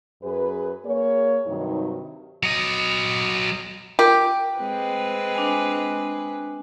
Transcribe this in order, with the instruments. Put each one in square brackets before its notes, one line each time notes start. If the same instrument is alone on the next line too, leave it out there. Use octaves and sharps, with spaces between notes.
[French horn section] F#2 G#4 B4
A#3 G#4 C#5
G2 C3 D#3 F#3 D#4
[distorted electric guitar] F#3 D#5
[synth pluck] F4 A#4 [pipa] G4
[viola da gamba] G#3 C4 B4
[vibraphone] D4 G#5